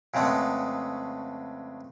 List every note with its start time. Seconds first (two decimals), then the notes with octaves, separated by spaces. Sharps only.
0.14 F2 C#3 G#3 A3 B3